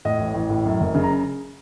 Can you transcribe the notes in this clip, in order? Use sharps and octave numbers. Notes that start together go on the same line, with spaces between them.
A2 D#5
A1
A1
A2
F#2
F#1
C#3
A#5